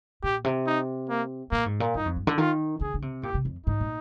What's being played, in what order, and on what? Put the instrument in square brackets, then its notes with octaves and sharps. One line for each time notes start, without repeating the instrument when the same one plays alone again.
[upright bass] A#2 [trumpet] G4
[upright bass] C3
[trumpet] D#4
A#3
[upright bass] A#2 [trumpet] A#3
[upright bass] G#2
A#2
[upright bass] G2 [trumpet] D#4
[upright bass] F2
G2
D3
[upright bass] D#3 [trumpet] F4
[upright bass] D3 [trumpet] G#4
[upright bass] D3
C3
[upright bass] A#2 [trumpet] G4
[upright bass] C3
F2
[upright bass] G#2 [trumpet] D#4
[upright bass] A#2